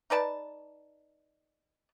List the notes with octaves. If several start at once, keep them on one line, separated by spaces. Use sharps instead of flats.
D#4 B4 D5 A5